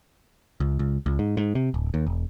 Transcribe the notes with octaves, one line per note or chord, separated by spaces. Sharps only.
C#2
C#2
C#2
G#2
G#2
C3
D1
D#2
E1